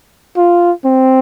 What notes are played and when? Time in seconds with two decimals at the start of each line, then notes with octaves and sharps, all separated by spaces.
0.37 F4
0.85 C4